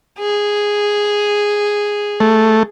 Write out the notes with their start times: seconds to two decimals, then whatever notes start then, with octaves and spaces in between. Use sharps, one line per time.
0.19 G#4
2.20 A3